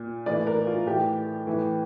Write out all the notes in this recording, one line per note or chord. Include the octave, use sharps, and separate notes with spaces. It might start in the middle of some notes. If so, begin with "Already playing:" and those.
Already playing: A#2
A2 E3 D5
A#4
F4
A2 E3 G4
A2 E3